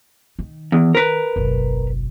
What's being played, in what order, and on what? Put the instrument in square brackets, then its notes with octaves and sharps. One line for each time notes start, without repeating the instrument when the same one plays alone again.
[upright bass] D#3
[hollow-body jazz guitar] E2
A#4 B4
[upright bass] F#1 B1